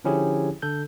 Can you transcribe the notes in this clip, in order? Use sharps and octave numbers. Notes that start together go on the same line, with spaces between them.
D3 F3 C#4 E4 G4 G#4
D3 A4 G6